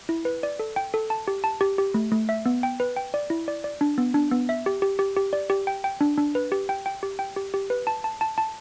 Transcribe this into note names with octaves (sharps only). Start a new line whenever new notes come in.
E4
B4
D5
A4
G5
A4
A5
G4
A5
G4
G4
A3
A3
E5
B3
G5
B4
G5
D5
E4
D5
D5
D4
B3
D4
B3
E5
G4
G4
G4
G4
D5
G4
G5
G5
D4
D4
B4
G4
G5
G5
G4
G5
G4
G4
B4
A5
A5
A5
A5